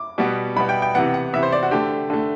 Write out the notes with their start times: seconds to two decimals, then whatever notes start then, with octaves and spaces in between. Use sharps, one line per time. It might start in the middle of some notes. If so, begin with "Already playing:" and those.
Already playing: D6
0.18 B2 G3 B3
0.56 B2 G3 B3 B5
0.69 G5
0.82 G5
0.95 C3 E3 B3 F#5
1.14 F#5
1.33 C3 E3 B3 E5
1.43 C5
1.52 D5
1.63 F#4
1.71 D3 A3 G4
2.10 D3 A3